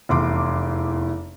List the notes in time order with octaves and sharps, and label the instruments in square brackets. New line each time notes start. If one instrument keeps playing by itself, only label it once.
[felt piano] F1 E2 E4 C6 D6